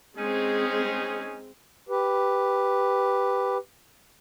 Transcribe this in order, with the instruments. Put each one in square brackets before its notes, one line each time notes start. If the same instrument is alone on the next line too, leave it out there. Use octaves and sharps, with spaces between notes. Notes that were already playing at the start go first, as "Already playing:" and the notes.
[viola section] G#3 C4 [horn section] C#4 D#4 G#4
[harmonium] G4 B4